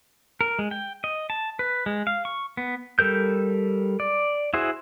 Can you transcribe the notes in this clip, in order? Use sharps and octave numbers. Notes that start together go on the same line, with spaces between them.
A#4
G#3
G5
D#5
A5
B4
G#3
F5
C#6
B3
G3 A4 A#4 G6
D5
E4 F#4 G#4 C5